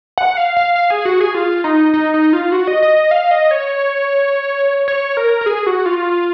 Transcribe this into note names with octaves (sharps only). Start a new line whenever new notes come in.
F#5
F5
F5
F5
G#4
F#4
G#4
F4
D#4
D#4
D#4
F4
F#4
D#5
D#5
D#5
F5
D#5
C#5
C#5
A#4
A#4
G#4
F#4
F4